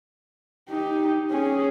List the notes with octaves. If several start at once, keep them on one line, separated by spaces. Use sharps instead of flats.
D#4 G4
C#4 G#4